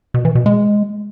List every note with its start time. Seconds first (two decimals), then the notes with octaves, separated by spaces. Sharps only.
0.14 B2
0.25 E3
0.35 B2
0.46 G#3